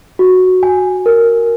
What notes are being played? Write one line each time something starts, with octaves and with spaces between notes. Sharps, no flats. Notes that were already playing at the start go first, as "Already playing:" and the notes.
F#4
G#5
A#4